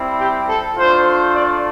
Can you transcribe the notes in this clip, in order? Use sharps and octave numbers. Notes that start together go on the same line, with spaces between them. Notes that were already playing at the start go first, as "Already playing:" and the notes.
Already playing: G3 C4 E4
G4
A4
A3 D4 F4 C5
D5